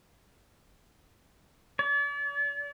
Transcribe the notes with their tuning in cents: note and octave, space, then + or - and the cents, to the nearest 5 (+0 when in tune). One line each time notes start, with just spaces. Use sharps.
D5 -40